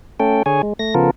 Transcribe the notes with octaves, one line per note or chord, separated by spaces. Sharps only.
A3 C#4 A4 G5
D3 G#4 C#5 G#5
G#3
A3 A#6
C#3 F3 B3 F4 A4 A#4